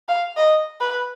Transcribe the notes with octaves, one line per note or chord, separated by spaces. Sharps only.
F5
D#5
B4